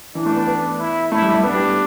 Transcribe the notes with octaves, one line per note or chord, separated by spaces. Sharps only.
E3 D4
A3
B3
B3
E4
A3 E4
G3
G3
B3 D4
G4